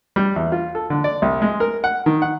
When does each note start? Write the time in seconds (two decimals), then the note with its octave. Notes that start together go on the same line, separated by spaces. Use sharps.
0.16 G3
0.36 E2
0.52 F4
0.75 A4
0.90 D3
1.04 D5
1.22 C2
1.42 G#3
1.60 A#4
1.84 F#5
2.06 D#3
2.22 F#5